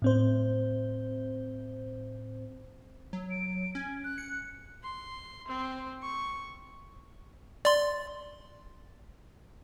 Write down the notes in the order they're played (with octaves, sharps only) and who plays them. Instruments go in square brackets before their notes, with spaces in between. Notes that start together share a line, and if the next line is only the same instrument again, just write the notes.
[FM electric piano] A2 C4 C5
[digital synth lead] F#3
[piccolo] D7
[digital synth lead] C#4 [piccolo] G#6
[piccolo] F#6
[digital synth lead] C#7
[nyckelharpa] C6
C4
C#6
[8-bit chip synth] D5 C6